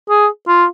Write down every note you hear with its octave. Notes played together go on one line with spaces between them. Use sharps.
G#4
F4